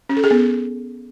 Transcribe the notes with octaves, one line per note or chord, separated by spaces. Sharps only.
C#4
A4
G#4
B3